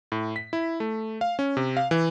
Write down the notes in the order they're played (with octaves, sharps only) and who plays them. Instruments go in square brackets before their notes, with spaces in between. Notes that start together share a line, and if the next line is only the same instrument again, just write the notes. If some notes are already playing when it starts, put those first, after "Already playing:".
[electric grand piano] A2
B6
E4
A3
F5
C#4
C3
F5
E3